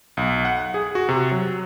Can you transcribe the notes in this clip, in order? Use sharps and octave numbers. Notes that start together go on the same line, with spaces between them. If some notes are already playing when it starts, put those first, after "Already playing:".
B1
F#5
G#4
F#4
C3
F#3